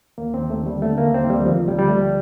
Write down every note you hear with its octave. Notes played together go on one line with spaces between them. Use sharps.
D#2 A#3
C4
D#2
A3
D3
G3
D3 A3
A#3
D#2
C4
D#2
G3
D2 F3
D2 G3
G3
D3 A3